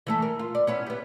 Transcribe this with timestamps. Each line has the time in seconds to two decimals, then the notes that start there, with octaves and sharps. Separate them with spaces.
0.07 E3 A3 A4
0.22 A#4
0.39 F4
0.55 D5
0.67 B3 C#4 E4
0.86 B3 G4